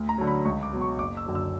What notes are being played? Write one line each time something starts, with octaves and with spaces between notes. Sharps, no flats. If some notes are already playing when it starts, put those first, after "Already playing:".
Already playing: D2
A#5
D3 F#3
B5
C#2 C#6
D6
B2 F#3
C#6
F#1 D6
E6
F#2 D3 F#3
E6